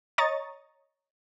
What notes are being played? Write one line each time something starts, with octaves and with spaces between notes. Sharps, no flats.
C#5 D#5 A#5 C#6 D#6 A6